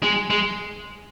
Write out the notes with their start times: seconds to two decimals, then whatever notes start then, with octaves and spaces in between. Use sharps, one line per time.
0.03 G#3
0.30 G#3